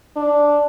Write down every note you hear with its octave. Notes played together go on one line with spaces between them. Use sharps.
D4